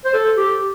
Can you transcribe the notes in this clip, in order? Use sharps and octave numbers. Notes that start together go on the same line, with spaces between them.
C5
A4
G4